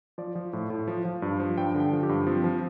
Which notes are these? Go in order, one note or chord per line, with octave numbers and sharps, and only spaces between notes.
F3 D5
F3
A2
A2
F3
F3
G2
F3
G2 G5
D3
G5
F3
G4
G2
F3 C4
F3